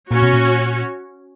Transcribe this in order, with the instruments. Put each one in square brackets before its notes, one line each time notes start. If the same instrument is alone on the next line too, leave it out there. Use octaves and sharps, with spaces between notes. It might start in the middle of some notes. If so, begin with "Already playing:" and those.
[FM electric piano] A#2 [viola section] C#4 F#4 C#5
[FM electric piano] B2
A#2